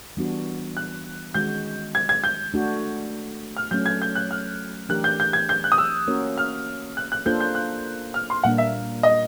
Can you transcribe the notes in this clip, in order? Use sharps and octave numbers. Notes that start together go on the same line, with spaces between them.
E3 G3 B3 D4 F#4
F#6
D#3 G#3 C#4 F#4 G6
G#6
G#6
G6
A3 D4 F#4
F6
F#3 A3 C#4 G6
G#6
G6
F#6
F6
E3 A3 D4 G4 A#4 F#6
G6
G6
G#6
G6
F#6
D#6
E6
A#3 C#4 F#4 A#4 C#5
F6
F#6
F#6
A#3 D4 F4 A4 C5 G6
G6
F#6
F6
C6
A#2 G3 A#3 D4 F#5
E5
D#5